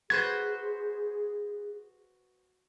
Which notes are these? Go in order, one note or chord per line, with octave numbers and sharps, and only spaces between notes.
F#4 G#4 B4 C5 G#6